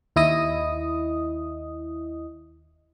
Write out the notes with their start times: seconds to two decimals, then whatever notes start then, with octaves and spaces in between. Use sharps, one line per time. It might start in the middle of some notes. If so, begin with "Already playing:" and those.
0.16 D#2 E4 D#5 D#6